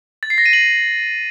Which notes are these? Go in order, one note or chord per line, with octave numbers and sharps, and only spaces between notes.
A6
C7
A#6
D#7
F#7